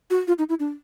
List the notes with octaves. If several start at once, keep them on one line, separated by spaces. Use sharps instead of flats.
F#4
F4
D#4
E4
D4